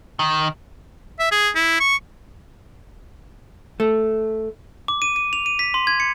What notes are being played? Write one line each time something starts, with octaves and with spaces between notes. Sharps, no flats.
D#3
E5
G#4
E4
C#6
A3
D6
D#7
D#7
F7
D#7
B6
C6
G#6
C#7